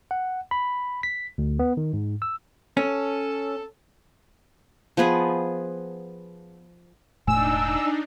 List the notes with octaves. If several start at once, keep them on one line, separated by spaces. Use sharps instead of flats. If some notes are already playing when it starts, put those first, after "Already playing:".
F#5
B5
B6
D2
B3
D#3
G#2
E6
C#4 A4
F3 B3 G#4 B4
E1 A2 A3 D4 D#4 G#5 E6